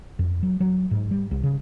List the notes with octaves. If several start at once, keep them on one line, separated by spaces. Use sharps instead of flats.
F2
F#3
F#3
G#2
G3
C2
C#3